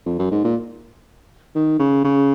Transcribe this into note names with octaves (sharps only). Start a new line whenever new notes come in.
F2
F#2
G#2
A#2
D#3
C#3
C#3